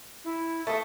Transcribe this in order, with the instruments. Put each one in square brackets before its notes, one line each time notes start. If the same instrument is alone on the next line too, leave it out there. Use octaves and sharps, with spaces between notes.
[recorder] E4
[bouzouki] A3 [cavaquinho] A4 D#6 [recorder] E5